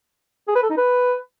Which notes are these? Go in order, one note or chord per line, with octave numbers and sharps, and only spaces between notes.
G#4
B4
A4
D#4
B4